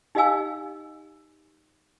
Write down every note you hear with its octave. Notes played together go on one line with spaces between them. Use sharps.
D#4 G4 D#5 F5 G#5 E6